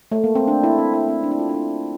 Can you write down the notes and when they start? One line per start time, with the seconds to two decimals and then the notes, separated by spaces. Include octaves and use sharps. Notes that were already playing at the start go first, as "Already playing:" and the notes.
0.11 A3
0.24 A#3
0.35 C4
0.47 D4
0.64 E4
0.79 C4
0.94 E4
1.09 C4
1.24 D4
1.31 E4
1.39 F4
1.49 D4
1.54 E4